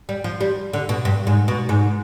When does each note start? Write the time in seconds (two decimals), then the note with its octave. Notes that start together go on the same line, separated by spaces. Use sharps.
0.09 G3
0.24 F3
0.41 G3
0.73 D3
0.89 B2
1.05 G2
1.27 G#2
1.48 B2
1.69 G#2